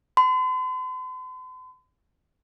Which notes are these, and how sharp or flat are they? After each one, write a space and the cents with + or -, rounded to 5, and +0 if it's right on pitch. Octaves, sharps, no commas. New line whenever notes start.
C6 -45